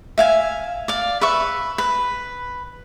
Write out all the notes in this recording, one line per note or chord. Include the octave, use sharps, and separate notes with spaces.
E5 F5 G#5
D5 F5
B4 E5 C#6
B4